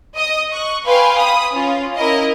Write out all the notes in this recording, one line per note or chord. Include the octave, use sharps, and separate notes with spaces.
D#5 D#6
C#6 F#6
B4 F5 G5 G#5 C6
B5 D#6
C#4 F4
C#4 E4 A#4 D#5